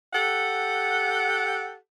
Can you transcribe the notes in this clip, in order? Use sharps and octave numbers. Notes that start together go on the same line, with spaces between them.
G4 A4 F#5